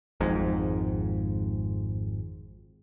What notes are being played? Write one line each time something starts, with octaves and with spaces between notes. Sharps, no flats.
G#1 F2 G#2